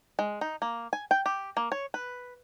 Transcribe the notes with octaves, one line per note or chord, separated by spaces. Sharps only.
G#3
D#4
A#3
G#5
G5
G4
A#3
C#5
B4